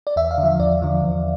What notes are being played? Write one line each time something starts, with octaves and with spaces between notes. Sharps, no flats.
D5
E2 E5
F5
D3
F3 E5
E2 D5
D3 F3
E2